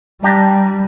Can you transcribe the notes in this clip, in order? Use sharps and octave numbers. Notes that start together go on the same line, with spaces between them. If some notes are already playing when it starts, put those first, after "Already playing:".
G3 D4 G4 A#5